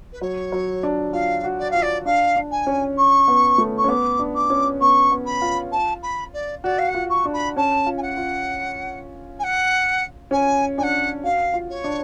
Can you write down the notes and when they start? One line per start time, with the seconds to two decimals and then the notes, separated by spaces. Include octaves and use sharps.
0.12 B4
0.21 F#3 C#5
0.52 F#3
0.83 D4
1.13 F4 F5
1.44 F#4
1.59 D5
1.70 F4 F5
1.82 D5
2.05 D4 F5
2.36 D4
2.51 G#5
2.67 C#4
2.98 C#6
3.28 B3
3.58 A3
3.78 C#6
3.84 C#4
3.88 B3 D6
4.19 D4
4.35 D6
4.50 C#4
4.81 B3 C#6
5.11 B3
5.26 B5
5.42 F4
5.72 A5
6.02 B5
6.33 D5
6.64 F#4 D5
6.78 F5
6.88 F#5
6.95 F4
7.10 C#6
7.25 D4
7.33 B5
7.56 C#4 A5
7.86 F4
7.97 G#5
8.02 F#5
8.17 F4
9.39 G#5
9.43 F#5
10.31 C#4 G#5
10.78 D4 F#5 G#5
11.23 F#4 F5
11.54 F4
11.69 C#5
11.84 D4